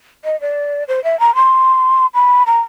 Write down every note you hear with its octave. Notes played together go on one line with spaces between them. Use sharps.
D#5
D5
C5
E5
A#5
C6
B5
A#5